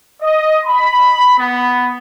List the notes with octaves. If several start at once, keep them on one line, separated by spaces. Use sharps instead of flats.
D#5
B5
B3